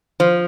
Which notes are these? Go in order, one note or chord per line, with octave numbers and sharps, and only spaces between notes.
F3 C5